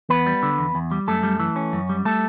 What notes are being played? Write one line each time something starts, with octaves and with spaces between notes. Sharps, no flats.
E2 B3 B4
G3
D3
E2
E2
G3
F#2 A3 A4
G3
E3
C#4
F#2
G3
A3 A4